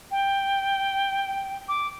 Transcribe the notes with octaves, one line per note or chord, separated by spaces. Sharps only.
G5
D6